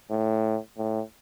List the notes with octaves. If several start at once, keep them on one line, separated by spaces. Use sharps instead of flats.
A2
A2